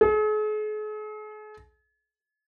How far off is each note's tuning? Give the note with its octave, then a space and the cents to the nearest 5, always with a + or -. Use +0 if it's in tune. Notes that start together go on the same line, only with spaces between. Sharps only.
G#4 +45